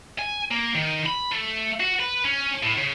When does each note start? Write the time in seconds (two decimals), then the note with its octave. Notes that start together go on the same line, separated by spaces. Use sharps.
0.19 G#5
0.51 A#3
0.75 D#3
1.06 B5
1.31 A3
1.80 F#4
2.00 B4
2.25 C#4
2.63 A2
2.78 C#3